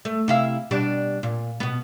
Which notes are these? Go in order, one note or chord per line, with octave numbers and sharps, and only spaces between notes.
A3
C3 E4 F5
B2 G3 D4
A#2
B2 B3